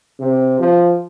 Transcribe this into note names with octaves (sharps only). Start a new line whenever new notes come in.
C3
F3